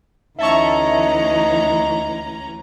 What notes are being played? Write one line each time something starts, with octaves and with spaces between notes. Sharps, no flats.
D2 E3 C#4 D#4 E5 A5 A#5 C#6